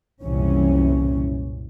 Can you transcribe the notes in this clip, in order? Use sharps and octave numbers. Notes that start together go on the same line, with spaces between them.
F#1 C2 A#2 E3 C#4